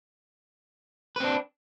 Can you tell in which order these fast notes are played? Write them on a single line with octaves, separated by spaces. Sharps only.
B4 C4 D4